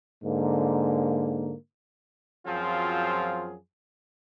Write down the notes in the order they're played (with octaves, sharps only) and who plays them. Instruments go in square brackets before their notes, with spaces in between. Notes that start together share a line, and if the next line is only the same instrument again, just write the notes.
[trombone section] G#2 D3 A#3
F#2 F3 F#3 C4 F4 G#4